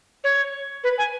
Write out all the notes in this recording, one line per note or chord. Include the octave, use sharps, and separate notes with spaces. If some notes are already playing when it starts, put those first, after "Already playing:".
C#5
B4
G#5